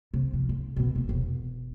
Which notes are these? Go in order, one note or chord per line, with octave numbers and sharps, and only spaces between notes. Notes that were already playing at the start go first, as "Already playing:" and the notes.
C3
F3
G#2
F#2 B2
C3 C4
E1